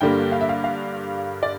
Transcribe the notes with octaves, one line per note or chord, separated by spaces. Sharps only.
G2 D3 G3 A#3 G5
F5
E5
F5
F5
D5